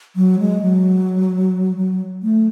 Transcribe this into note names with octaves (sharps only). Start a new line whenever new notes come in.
F#3
G#3
F#3
F#3
A3